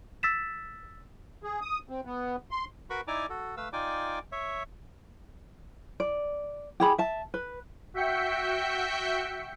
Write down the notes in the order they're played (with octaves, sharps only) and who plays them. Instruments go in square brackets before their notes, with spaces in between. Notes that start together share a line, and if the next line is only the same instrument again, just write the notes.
[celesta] E6 A6 B6 E7
[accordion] G#4
D#6
C4
B3
C6
[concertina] F#4 A#4 B4 B5 C#6
D#4 E4 D5 G#5 A#5 D6
F#4 A4
A3 B4 F5 E6
D#4 F4 D5 G5 G#5 D6
C#5 E5
[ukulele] D5
G4 G#4 B5
E5 A5
B4
[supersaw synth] F#4 E5 G5 G6 B6 C#7